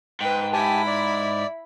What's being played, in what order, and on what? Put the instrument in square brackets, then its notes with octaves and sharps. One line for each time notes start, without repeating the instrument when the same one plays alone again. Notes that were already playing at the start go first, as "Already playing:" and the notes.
[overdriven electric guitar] G#2 [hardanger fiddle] B4 G5
[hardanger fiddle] E4 B5 [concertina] G4 G#5 A5
[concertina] D5